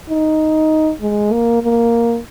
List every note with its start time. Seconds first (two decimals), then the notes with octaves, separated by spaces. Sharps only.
0.09 D#4
1.01 G#3
1.32 A#3
1.63 A#3